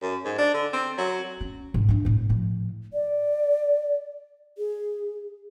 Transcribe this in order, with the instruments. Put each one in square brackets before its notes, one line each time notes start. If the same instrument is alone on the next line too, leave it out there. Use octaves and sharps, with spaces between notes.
[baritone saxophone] F#2
G#2
D4
D3
C4
F#3
[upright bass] C#4
G#2
D4 F4
E2 A2
A2 F3
[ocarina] D5
G#4